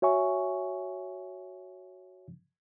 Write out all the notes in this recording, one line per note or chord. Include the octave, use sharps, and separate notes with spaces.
F#4 C#5 E5 G#5 C#6